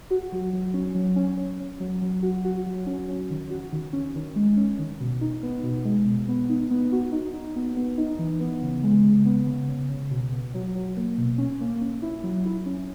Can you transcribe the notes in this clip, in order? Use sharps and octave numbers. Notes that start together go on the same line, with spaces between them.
F#4
F#3
F#3
C#4
F#3
C#4
C#4
C#4
F#3
F#3
F#4
F#4
F#3
C#4
C#4
D#3
F#4
D#3
C#4
D#3
G#3
C#4
D#3
B2
D#4
B3
B2
G#3
B2
B3
D#4
B3
F#4
D#4
D#4
B3
B3
D#4
E3
B3
C#3
G#3
C#3
B3
C#3
C#3
C#3
B2
B2
F#3
F#3
A#3
B2
C#4
A#3
C#4
E4
F#3
E4
C#4